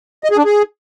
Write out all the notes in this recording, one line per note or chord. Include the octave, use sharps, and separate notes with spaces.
D#5
G#4
D4
G#4